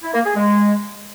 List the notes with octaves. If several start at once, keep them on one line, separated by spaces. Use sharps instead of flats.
E4
A#3
G#4
G#3